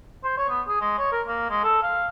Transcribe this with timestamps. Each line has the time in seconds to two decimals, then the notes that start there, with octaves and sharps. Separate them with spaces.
0.24 C5
0.38 C#5
0.49 B3
0.68 G#4
0.81 G#3
0.98 C#5
1.12 A#4
1.28 A#3
1.50 G#3
1.64 A4
1.83 F5